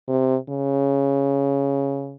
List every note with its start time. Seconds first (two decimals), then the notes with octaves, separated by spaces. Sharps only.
0.08 C3
0.49 C#3